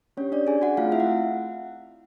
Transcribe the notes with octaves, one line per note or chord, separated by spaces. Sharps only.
C#4 D4 G4 C#5
D4 D5
G#4 G#5
F#4 F#5
A3 C4 F4 F5
E4 E5
F#5